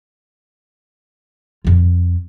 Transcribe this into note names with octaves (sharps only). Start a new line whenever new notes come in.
F2 F4